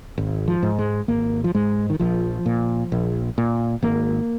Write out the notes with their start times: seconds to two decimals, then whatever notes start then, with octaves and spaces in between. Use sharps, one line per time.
0.18 G#1
0.48 F3
0.63 G#2
0.79 G#3
1.08 G#1 A#3
1.44 F3
1.55 G#2 G#3
1.90 D#3
2.00 A#1 F3
2.46 A#2
2.92 A#1
3.38 A#2
3.82 G#1 A#3